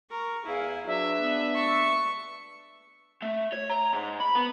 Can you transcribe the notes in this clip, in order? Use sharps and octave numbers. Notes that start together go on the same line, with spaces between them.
A#4 C#6
E2 E4 G#4 F5
F#3 D4 B4 E5
B3
A5 C#6
A3
C#5
A#5
G#2
B5
B3